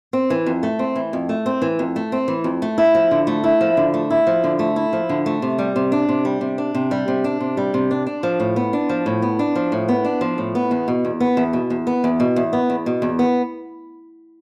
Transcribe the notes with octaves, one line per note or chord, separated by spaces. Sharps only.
C4
E3
F2
A3
C4
E3
F2
A3
C4
E3
F2
A3
C4
E3
F2
A3
E4
F3
D3
A3
E4
F3
D3
A3
E4
F3
D3
A3
E4
F3
D3
A3
C3
G3
C3
D4
C3
G3
C3
D4
C3
G3
C3
D4
C3
G3
C3
D4
D4
F3
A2
B3
D4
F3
A2
B3
D4
F3
A2
B3
D4
F3
A2
B3
E2
B2
E2
B3
E2
B2
E2
B3
E2
B2
E2
B3
E2
B2
E2
B3